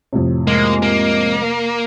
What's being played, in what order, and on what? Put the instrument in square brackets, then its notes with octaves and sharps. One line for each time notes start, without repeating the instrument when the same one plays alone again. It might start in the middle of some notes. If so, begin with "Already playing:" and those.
[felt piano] F2 A2 C3
[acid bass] G#3 [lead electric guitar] A#3
[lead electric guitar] A#3